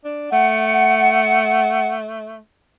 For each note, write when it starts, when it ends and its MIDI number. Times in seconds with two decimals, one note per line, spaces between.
0.04 0.32 62
0.32 2.38 57
0.32 1.93 78